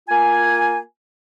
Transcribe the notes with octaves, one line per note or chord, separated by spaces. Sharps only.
A#3 F4 G#5